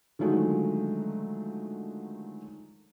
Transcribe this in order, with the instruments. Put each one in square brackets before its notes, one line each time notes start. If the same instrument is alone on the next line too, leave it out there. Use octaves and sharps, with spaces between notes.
[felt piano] D3 D#3 F3 F#3 G#3 A3